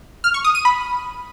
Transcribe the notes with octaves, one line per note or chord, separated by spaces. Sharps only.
F6
C#6
D#6
D#7
B5